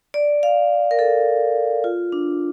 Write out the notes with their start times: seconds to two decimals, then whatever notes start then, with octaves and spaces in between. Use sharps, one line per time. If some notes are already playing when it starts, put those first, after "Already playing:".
0.14 D5
0.43 F5
0.91 A#4
0.99 A4
1.84 F4
2.12 D4